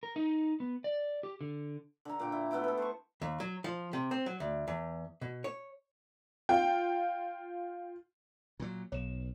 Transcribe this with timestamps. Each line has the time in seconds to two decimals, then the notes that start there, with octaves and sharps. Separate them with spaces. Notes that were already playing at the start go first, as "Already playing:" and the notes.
0.03 A#4
0.16 D#4
0.60 B3
0.84 D5
1.23 G4
1.41 D3
2.05 D3 A#5
2.19 A#2 G5
2.32 E4
2.51 A3 B3 E4 G5
2.64 A4 B4
2.78 C5 C#6
3.22 D#2
3.40 F#3
3.64 F3
3.93 C3
4.11 C4
4.26 F#3
4.40 D2
4.68 E2
5.21 B2
5.44 C#5
6.49 F4 G5
8.60 A#2 F#3
8.92 B1 C#5 E7